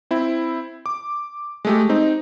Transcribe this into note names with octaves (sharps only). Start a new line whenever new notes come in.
C4 E4
D6
G#3 A3 G4
C4 D#4